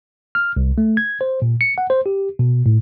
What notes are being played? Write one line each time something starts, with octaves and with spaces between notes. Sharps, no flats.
F6
C2
A3
G#6
C5
A#2
C#7
F#5
C5
G4
B2
A2